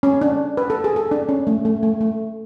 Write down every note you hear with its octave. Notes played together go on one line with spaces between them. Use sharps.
C#4
D4
B4
A4
G#4
A4
D4
C#4
A3
A3
A3
A3